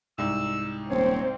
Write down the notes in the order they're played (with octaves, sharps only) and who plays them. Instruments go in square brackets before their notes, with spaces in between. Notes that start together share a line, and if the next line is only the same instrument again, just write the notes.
[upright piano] C2 G#2 [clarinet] E6
[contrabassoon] D#1 [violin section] C4 [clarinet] C#5